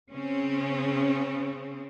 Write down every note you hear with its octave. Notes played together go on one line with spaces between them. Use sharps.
C#3 C4 C#4